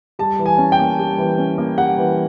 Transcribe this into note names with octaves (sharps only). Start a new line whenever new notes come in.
G3 A5
E3
G#5
C#4
G5
A#3
G3
E3
C#4
A#3
G3 F#5
E3